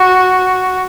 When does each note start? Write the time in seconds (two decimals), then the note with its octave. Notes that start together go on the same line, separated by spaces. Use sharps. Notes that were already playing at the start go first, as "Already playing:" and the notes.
Already playing: F#4